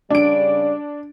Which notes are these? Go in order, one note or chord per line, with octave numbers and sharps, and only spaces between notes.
C#3 G3 D4 D5 D7